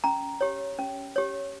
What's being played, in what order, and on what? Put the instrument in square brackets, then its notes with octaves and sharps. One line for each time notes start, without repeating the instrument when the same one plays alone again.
[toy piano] C#4 A#5
G4 C#5
C#4
G4 C#5